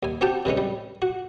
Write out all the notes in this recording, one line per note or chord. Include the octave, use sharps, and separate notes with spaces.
D#2 G#5
C4 F#4 G4 G5 A5
C3 E3 G#3 C#4
G3
F#4